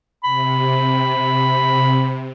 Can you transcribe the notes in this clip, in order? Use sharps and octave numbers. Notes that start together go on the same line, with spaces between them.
C3 B5